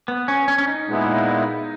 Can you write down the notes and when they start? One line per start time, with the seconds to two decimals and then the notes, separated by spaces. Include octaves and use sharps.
0.08 B3
0.28 C#4
0.48 C#4
0.58 C#4
0.67 D#4
0.88 A#2 G#3 B3 E4